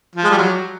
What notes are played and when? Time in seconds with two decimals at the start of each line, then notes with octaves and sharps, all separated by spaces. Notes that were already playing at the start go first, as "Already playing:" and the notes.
0.15 F3
0.24 G#3
0.31 G3
0.38 F#3